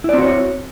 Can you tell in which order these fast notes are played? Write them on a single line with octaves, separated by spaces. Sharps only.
E4 D5 C4 F#4 C#5